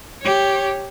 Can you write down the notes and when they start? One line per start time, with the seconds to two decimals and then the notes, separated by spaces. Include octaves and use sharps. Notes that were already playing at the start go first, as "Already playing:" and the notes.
0.22 G4 C#5